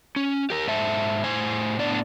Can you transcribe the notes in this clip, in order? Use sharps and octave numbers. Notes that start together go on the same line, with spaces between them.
C#4
G4 A#4
G#2 C5 E5 A5
A2 C5 G#5
A2 B3 D4 D5